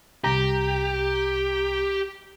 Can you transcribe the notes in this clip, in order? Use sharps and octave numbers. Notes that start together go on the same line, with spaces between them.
C2 G4 A#5